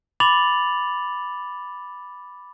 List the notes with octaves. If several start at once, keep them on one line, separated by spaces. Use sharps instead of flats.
B5 D6 A6 F7 F#7